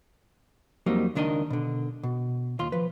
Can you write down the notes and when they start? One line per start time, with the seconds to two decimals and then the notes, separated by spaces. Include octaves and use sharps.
0.86 F2 F#3 G3 A#3 C4 D#4
1.15 C#2 D#3 D4 A#4 D#5
1.50 B2 D3
2.03 B2
2.59 D#2 F4 C6
2.72 F3 B4